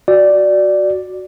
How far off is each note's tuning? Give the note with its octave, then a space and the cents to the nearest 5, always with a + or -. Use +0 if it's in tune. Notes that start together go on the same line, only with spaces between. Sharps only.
F#4 +0 D5 +0